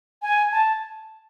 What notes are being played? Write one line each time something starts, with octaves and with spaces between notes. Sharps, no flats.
G#5
A5